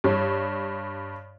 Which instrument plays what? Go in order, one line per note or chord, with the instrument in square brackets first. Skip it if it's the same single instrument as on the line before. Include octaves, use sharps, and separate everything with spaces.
[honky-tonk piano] G2 C#5